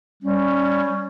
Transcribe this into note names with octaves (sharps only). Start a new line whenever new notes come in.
G3 C#4